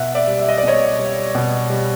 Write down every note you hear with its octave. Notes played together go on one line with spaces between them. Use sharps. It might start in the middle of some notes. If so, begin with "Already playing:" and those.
Already playing: B2 E5 F#5
D5 E5
G3
E5
D#5
D5
B2 C#5 D#5
G3
B2
G3